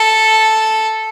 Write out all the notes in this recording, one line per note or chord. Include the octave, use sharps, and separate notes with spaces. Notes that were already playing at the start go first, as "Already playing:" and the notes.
Already playing: A4